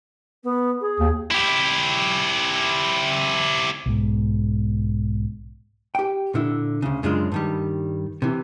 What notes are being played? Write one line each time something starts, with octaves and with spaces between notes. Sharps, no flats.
B3
G#4
D#2
E4 G4
B1 G#2
G4 G5
A#2 D3 E4
D2 C#3
F#2 C#3 G#3 D4 F4
G2 D#3 G3
C3 E3